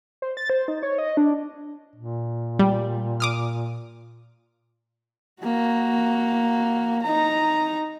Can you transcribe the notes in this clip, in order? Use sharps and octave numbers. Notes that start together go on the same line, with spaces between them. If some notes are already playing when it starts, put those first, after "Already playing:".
C5
A6
C5
D#4
C#5
D#5
D4
A#2
G3
D6 D#6 F6
A#3 F#4
D#4 A#5